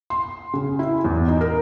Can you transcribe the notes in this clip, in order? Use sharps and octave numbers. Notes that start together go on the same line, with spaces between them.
C6
C#3
E4
E2
D#4
A#4